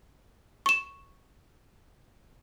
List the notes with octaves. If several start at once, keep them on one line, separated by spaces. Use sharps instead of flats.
C#6 E7